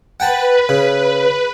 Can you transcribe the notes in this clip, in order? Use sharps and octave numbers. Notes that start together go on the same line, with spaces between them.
B4 F#5 G5 A5
C#3